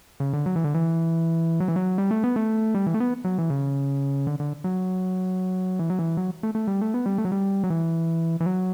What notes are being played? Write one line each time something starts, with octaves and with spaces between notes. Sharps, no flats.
C#3
D3
F#3
E3
D3
E3
F#3
E3
F#3
G3
A3
B3
A3
G3
E3
A3
B3
F#3
E3
C#3
D3
D3
F#3
E3
F#3
E3
F#3
A3
A3
G3
A3
B3
G3
A3
F#3
G3
F#3
E3
E3
F#3